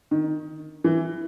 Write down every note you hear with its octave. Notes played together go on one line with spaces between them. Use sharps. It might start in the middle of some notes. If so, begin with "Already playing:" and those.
D#3
E3